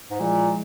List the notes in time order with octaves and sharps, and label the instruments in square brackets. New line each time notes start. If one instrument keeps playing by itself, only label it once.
[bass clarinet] G#2
[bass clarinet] A#2 [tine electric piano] F3 G#3 E4